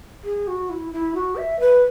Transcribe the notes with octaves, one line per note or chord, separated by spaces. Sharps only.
G#4
F#4
E4
E4
F#4
E5
B4